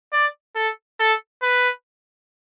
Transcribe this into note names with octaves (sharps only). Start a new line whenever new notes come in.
D5
A4
A4
B4